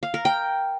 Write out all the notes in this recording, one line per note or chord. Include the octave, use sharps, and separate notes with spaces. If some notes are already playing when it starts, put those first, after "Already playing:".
F5
A#4
G5